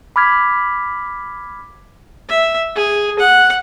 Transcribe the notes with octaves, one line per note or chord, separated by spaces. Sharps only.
B5 D6 F6 G#6 B6
E5
G#4
F#5